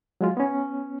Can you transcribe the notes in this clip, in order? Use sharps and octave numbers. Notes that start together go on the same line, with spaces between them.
F#3 G#3 F4
B3 C#4